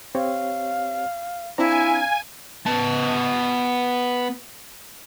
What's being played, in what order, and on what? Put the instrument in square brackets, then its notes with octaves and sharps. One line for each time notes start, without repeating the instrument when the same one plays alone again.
[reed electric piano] C4 G4 C#5 [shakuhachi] F5
[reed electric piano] C4 D4 A#5 [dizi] E4 [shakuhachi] F5 [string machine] G#5
[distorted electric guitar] B3 A5